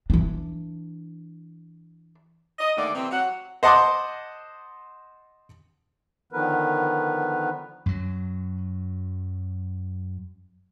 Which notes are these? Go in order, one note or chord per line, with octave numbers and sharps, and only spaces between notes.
E3 D4
D#5
D#2 D3 A3 A#3 D5
C3 E3 C4
F#3 F#5
C5 D#5 F#5 A5 C6 D6
D3 D#3 F3 B3 A#4 B4
F#2 F#3